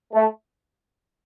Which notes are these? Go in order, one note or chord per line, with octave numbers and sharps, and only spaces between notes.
A3